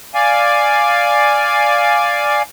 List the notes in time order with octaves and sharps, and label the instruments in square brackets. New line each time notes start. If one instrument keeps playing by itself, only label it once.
[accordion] D5 F5 G#5